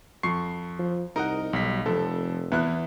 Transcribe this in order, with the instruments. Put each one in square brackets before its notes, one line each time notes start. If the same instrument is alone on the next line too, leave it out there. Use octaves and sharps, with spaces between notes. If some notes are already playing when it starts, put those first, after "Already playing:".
[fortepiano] F2 C#6 [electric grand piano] C7
[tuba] F3
[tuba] C2 [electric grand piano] D#4 [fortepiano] A#4 D#5 F#5
[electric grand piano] B1 B6 [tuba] G3
[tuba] F1 [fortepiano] F2 [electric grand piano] A4
[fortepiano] E2 F#6 [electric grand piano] B3 E4